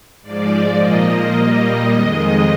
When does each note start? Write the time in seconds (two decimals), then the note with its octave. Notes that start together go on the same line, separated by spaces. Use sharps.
0.22 G#2 F3 G#3 D5
0.77 A#2 F3 A#3 D#5
1.34 A#2 G3 A#3
1.89 F2 D#3 G#3 D#5